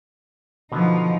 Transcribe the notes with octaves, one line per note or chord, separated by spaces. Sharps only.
B2 D3 F3 B3 D#4